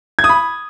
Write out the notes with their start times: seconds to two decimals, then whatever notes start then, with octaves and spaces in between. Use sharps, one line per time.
0.19 G#6
0.24 D#6
0.29 B5